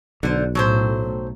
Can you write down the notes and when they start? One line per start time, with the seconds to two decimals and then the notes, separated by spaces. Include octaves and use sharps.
0.23 B1 D3 C5
0.55 A2 F#3 A4 C5